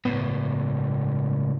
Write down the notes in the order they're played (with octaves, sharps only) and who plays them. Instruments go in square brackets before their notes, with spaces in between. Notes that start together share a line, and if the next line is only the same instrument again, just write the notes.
[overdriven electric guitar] C#2 A2 [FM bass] B3